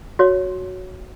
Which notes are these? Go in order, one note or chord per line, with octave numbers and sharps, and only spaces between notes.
F#4 C#5